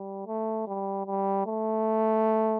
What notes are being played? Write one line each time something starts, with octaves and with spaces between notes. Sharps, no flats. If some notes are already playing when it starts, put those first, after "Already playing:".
Already playing: G3
A3
G3
G3
A3